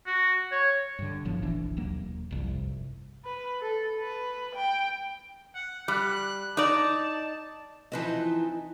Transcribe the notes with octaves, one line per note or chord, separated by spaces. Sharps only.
F#4
C#5
G2 D3
G1 A2 F3 B3
F1 A#1 E3 D4
E1 D#2 F#3 A#3
G1 C2 F2
B4
A4
B4
G5
F#5
G3 F#6
D#4 D5 A5
E3 F3 C4 D#4 B4 D#5